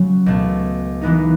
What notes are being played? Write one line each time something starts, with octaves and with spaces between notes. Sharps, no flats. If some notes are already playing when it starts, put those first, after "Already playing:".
Already playing: C#3 F#3 C#4
C#2 B2 A3
E3 G#3 B3 D#4